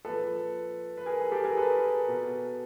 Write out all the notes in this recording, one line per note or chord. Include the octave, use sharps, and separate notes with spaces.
A#2 F3 A4 B4
B4
G#4 A#4
G#4
G4 A4
G#4 A#4
A4 B4
B2